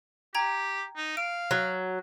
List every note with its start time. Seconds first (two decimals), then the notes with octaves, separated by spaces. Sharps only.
0.35 G4 G5 A#5 G#6
0.96 D#4
1.17 F5 D7
1.51 F#3